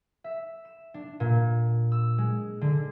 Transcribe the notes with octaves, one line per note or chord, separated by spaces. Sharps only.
E5
E7
D4
A#2
E6
G#3
D3